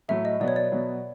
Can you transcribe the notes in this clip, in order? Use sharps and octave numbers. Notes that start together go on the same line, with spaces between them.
A2 F#3 A3 E5
D#5
B2 F#3 B3 D5
C#5
D5
B2 F#3 B3